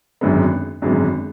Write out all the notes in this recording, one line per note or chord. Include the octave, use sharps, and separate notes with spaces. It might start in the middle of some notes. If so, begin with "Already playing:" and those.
G#1 F#2 D3 G#3 B3
G#1 F#2 D3 G#3 B3